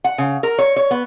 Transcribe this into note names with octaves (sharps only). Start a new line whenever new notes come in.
F#5
C#3
A#4
C#5
C#5
B3